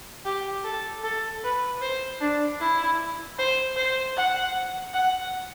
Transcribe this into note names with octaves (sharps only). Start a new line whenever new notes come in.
G4
A4
A4
B4
C5
D4
E4
C5
C5
F#5
F#5